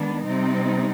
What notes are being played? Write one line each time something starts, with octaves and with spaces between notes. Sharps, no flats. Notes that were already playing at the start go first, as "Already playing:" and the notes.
Already playing: D#3 G#3 B3 D4
C3 G3 C4 D#4